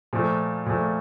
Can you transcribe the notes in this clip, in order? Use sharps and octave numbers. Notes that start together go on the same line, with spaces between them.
A#2 F3 A3
A#2 F3 A3